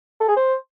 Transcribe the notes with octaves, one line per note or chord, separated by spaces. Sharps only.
A4
G#4
C5